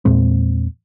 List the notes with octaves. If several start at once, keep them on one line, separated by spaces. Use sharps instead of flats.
E2 A#2 G#3 C4